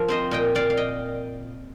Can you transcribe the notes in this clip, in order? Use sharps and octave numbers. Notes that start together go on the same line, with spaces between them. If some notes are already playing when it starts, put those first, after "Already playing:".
Already playing: F3 A#4
C4 C5 D#5
A#2 D#5 G5
A#2 D5 F5
F5
D#5 G5